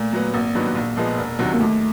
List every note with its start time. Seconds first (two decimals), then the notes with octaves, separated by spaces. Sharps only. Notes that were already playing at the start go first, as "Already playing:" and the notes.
Already playing: A#2 A3
0.13 F#3 B3
0.34 G#1 A#3
0.55 G2 D#3 F#3 B3
0.75 A#1
0.96 A#2 F3 G#3 B3
1.18 E1
1.39 D2 C3 D#3 F#3
1.54 A#3
1.60 D#2 A3